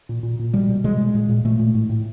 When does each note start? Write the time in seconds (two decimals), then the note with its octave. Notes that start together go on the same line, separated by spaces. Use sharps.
0.09 A#2
0.23 A#2
0.39 A#2
0.53 B2 G3
0.69 B2
0.84 B2 G#3
0.99 B2
1.14 A#2
1.29 A#2
1.45 A#2 A3
1.59 A#2
1.75 A2
1.89 A2